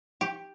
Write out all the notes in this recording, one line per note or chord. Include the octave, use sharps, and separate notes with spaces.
G4